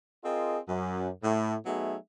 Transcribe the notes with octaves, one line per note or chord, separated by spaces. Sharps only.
C4 F4 G#4 A#4 D#5
F#2
A2
F#3 A3 B3 D#4 G#4 E5